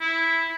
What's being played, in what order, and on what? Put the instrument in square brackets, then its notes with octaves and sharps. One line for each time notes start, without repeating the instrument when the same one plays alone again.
[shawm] E4